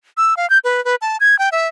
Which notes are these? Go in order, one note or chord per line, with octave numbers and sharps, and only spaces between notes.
E6
F5
G6
B4
B4
A5
G#6
G5
E5